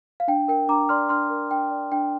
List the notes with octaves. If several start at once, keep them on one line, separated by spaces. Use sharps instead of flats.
F5
D4 G5
A#4 G5
D4 A#5 D6
D5 C6 F6
D4 C6 F6
A#4
D4 G5
D5
D4 G5